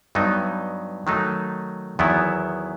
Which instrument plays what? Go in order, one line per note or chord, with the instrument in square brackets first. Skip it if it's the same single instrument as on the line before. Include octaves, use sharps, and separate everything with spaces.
[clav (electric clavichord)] G2 F#3 B3 D#4
D#3 F#3 A3 D#4
E2 D#3 F#3 B3 E4